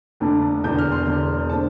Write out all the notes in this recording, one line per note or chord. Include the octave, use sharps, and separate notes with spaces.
F1 F2 D3 A3 D4
E1 E2 D3 G6
F6
C6
E1 E2 D3
D3 A3 C4 A5